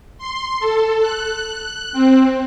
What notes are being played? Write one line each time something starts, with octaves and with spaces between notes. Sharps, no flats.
C6
A4
F#6
C4